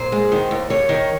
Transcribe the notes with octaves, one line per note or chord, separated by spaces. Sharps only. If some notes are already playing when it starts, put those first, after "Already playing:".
Already playing: A#2 C5
G#3
D#3
D#2
D#2 C#5
D#3